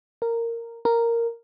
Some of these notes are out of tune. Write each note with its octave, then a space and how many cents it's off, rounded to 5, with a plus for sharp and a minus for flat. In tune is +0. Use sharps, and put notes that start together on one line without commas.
A#4 -10
A#4 -5